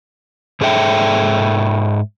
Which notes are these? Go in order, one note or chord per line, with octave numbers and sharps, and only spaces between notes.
G#2 G#4 A4 E5 G5